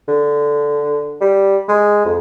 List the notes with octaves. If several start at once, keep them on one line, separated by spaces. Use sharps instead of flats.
D3
G3
G#3
F2